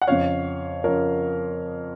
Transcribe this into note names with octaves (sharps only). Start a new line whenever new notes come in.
F#5
F2 C#3 F3 C#5 F5
C#3 F3 A#4 C#5